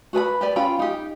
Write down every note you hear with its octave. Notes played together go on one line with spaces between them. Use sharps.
F#4 B4 G#5 B5
G4 B4 D5
C#4 F4 G5 B5
D#4 G4